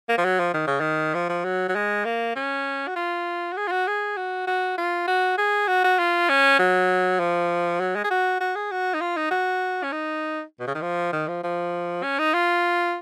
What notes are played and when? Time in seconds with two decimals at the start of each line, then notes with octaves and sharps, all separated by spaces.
0.09 A#3
0.18 F3
0.25 F#3
0.39 F3
0.54 D#3
0.67 C#3
0.80 D#3
1.15 F3
1.30 F3
1.45 F#3
1.69 F#3
1.75 G#3
2.05 A#3
2.36 C#4
2.88 F#4
2.96 F4
3.53 F#4
3.57 G#4
3.68 F4
3.72 F#4
3.88 G#4
4.17 F#4
4.47 F#4
4.78 F4
5.08 F#4
5.38 G#4
5.68 F#4
5.84 F#4
5.99 F4
6.30 C#4
6.59 F#3
7.20 F3
7.80 F#3
7.96 G#3
8.04 G#4
8.10 F#4
8.41 F#4
8.56 G#4
8.71 F#4
8.94 D#4
9.01 F4
9.17 D#4
9.31 F#4
9.83 C#4
9.92 D#4
10.60 B2
10.67 C#3
10.75 D#3
10.82 F3
11.13 D#3
11.28 F3
11.43 F3
12.03 C#4
12.19 D#4
12.34 F4